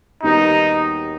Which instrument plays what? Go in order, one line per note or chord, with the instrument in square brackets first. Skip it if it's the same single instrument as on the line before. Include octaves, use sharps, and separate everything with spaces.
[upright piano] D#2 D#3 G3 B3 F#4 [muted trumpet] D#4